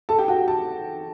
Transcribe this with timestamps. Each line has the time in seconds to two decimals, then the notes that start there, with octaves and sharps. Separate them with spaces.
0.09 A4 A5
0.19 G4 G5
0.28 F#4 F#5
0.48 A5